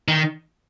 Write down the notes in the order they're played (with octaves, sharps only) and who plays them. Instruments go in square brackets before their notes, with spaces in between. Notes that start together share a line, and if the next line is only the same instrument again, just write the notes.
[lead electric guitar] D#3